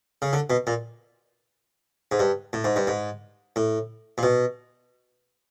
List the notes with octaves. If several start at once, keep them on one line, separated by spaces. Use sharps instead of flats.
C#3
D3
B2
A#2
G#2
G2
A2
G#2
G2
G#2
A2
A#2
B2